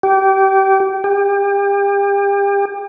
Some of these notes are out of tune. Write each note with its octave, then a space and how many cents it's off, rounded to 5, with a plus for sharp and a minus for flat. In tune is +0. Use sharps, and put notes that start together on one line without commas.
G4 -25
G4 +35